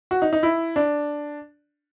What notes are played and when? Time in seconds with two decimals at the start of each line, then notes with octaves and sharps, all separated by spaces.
0.11 F#4
0.22 D#4
0.33 D#4
0.43 E4
0.76 D4